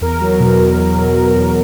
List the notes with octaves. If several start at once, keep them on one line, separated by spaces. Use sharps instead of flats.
E2 A#4
F#3
B2
E2
E2
F#3
B2
E2